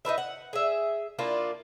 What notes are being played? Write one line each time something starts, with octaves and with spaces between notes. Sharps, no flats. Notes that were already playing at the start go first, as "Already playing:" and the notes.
D#4 F4 B4 E5
F#5
G#4 E5
A#3 D4 E4 F4